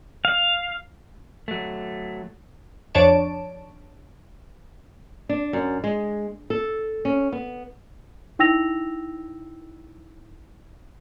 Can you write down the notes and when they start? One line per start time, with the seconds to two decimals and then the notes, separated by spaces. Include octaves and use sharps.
0.25 F5
1.48 F#3 A3
2.94 F2 D4 C#5 A5 D7
5.29 D4
5.53 F#2
5.84 G#3
6.50 A4
7.05 C#4
7.32 B3
8.39 D#4 E4 G5 E6 A#6 F7